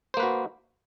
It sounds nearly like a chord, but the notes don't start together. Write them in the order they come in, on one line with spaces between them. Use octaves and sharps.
C5 A#3 B4 F#4